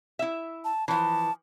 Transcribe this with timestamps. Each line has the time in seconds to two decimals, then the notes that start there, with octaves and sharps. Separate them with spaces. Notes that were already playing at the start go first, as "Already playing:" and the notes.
0.19 E4 E5
0.65 A5
0.88 E3 F3 A5